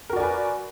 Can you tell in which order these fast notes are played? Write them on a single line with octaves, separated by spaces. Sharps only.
A#4 F#4 D5 G#5 B4